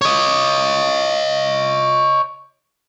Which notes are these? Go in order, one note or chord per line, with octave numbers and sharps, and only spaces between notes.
C#5 D#5